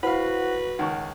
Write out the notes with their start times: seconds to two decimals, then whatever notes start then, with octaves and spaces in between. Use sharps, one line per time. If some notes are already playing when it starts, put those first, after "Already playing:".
0.03 E4 F#4 B4 C5 F5 F#5 B5
0.79 C#2 D#3 F#5 C#6